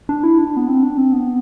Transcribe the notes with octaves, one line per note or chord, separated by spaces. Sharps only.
D4
E4
D4
B3
C4
D4
C4
B3